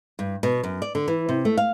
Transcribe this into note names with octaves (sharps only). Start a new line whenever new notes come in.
G2
B2
F#2
D5
D3
E3
C3
A3
F5